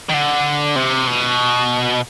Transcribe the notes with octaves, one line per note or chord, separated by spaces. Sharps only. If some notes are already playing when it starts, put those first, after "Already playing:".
D#3
D3
C3
B2